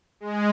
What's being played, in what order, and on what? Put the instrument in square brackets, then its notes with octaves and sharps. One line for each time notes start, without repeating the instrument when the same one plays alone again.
[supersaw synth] G#3